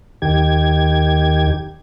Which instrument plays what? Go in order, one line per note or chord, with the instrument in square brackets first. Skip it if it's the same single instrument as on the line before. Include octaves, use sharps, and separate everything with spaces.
[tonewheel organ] D#2 D#3 G4 G#6